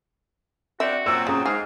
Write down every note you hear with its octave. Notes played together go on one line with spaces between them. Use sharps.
C4 D4 F#4 E5
A#2 F#3 C4 E6
C#3 A#5 D#6
G#2 G#4 F5